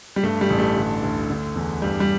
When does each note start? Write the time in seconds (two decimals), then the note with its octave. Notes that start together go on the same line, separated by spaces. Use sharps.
0.16 G3
0.23 G2 A3
0.41 G3
0.50 A1
0.59 A3
0.77 D3
1.03 D2
1.30 D3
1.56 E2
1.82 G2 G3
2.00 G3